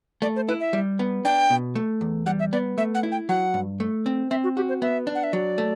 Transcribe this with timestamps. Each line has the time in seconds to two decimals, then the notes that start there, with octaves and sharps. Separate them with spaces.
0.22 A3 D5
0.36 C5
0.48 E4 B4
0.60 E5
0.73 G3
0.99 B3
1.25 D4 G5
1.50 B2
1.75 A3
2.01 E2
2.26 G3 F#5
2.40 E5
2.53 B3 D5
2.78 A3 E5
2.95 F#5
3.03 E4
3.12 G5
3.29 F#3 F#5
3.54 G2
3.80 A3
4.06 C4
4.31 C4 E5
4.44 F#4
4.56 F#4 G4
4.69 C5
4.82 B3 E5
5.07 D4
5.15 F#5
5.24 E5
5.33 F#3 D5
5.58 A3